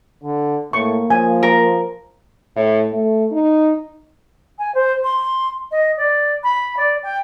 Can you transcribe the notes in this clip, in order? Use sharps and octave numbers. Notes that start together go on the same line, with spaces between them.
D3
A2 A#3 C#6
F3 G#5
A#4
A2
A3
D#4
G#5
C5
C6
D#5
D5
B5
D5
G5